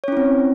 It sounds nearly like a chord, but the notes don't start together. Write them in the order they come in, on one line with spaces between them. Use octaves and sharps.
C#5 C#4 E4 C4